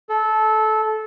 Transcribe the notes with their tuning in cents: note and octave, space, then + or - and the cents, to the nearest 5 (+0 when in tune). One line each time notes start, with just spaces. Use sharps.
A4 -20